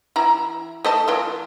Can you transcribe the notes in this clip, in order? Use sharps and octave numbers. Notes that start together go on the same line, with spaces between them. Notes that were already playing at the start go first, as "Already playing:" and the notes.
E3 E4 A#5
A3 D#5 A5
E3 F4